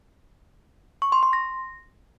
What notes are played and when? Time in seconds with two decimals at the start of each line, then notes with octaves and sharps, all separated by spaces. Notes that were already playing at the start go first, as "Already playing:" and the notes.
1.02 C#6
1.12 C6
1.23 C6
1.33 A#6